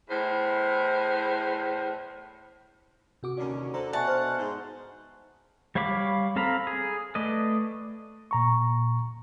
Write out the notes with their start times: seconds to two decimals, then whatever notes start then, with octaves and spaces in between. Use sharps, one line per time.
0.10 E2 A2 C5
3.23 C3 F#4 D6
3.38 D#2 D3 C#4 D5
3.74 D3 D4 A4 C5 A#5
3.93 B2 D5 E5 F#5 G#5 A5 C#6
4.07 C5 F6
4.38 G#2 C5
5.75 G3 C#5 F5 B5 D6
6.36 C4 A4 F5 A#5 B5
6.67 G#4
7.15 A3 B4 D5 D#5
8.31 A#2 A#5 C#6